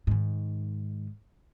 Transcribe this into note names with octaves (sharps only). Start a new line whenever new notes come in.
G#2 D#3